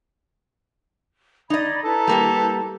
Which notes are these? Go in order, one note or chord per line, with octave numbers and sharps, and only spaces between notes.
D#4 D5 D#5 B5 G#6
E4 A4 B4 A#5
G3 A#3 G4